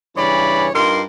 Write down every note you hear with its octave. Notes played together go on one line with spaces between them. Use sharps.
G2 C#3 E3 C#5 D5 B5
G2 D#4 F4 A#4 C6